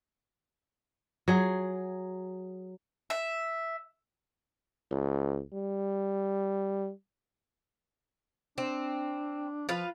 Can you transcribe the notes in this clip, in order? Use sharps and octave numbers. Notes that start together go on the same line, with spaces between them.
F#3 G#4
E5
C#2
G3
C4 D4
F3 F4 B4 F5